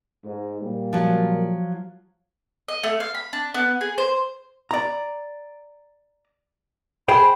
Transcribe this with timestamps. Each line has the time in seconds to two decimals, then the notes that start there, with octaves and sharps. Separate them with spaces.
0.24 G#2
0.61 A#2 G3
0.93 F3 F#3
2.68 D#5
2.83 A3
3.00 F5
3.15 B5
3.33 D4
3.54 B3
3.81 G#4
3.98 C5
4.71 D5 A#5
7.08 G#4 C5 G5 B5